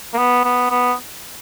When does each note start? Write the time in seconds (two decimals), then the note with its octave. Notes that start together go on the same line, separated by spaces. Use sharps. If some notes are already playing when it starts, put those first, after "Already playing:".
0.13 A#3
0.18 B3
0.44 B3
0.70 B3